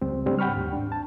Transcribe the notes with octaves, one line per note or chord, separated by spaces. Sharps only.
C#2 G3 C4
G#2 G3 A3 C4 D4
F#5 G5 B5 C#6 F6
D#2 G#2
D4
A5